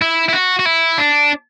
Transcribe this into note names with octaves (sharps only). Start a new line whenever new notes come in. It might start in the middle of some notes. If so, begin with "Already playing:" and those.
E4
E4
F#4
F#4
E4
D4